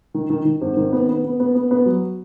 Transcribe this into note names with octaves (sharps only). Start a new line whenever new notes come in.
D#3
D#3
D#3
G#1
D#3
B3
B3
B3
B3
B3
B3
F#3